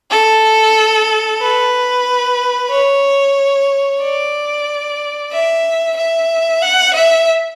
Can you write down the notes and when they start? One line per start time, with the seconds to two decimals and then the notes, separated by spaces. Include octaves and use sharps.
0.11 A4
1.41 B4
2.70 C#5
4.01 D5
5.32 E5
5.97 E5
6.62 F#5
6.94 E5